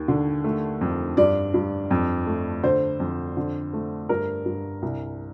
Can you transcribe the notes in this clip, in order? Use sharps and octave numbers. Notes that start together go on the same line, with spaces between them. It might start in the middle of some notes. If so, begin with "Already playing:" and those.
Already playing: D#2
D3
A3
F2
G2 D5
G2
F2
A3
D3 C5
F2
D3
A3
G2 A#4
G2
C2